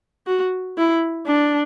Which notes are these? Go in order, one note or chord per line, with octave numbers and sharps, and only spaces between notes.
F#4
E4
D4